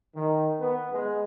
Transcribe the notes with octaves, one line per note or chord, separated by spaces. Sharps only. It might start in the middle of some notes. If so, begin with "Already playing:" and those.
D#3
B3
G#3